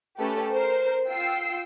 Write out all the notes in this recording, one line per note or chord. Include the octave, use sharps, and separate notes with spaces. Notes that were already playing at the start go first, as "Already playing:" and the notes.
A3 C#4 G4 A4 B4
A#4 C5
F4 G5 E6 C7